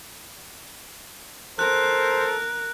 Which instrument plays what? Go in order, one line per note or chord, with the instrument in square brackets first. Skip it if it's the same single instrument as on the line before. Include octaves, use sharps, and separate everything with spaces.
[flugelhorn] A4 [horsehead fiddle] A#4 [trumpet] C5 [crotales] F#6